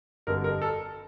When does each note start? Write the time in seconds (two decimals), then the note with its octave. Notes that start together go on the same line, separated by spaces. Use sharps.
0.27 G1 F2 D3 G3 A#4
0.44 A#4
0.62 A4